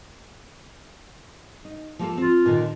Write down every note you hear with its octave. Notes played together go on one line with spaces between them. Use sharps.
D#4
F3 A#3 A4
C4 F4
A#2 D3 D#3